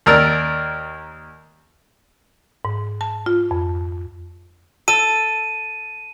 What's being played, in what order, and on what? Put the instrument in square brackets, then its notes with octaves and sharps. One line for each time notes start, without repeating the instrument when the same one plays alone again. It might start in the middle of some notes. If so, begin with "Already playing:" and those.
[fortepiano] D#2 A#4 D5 E6
[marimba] G#2
A5
F4
F2
[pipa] A4 [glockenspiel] D#7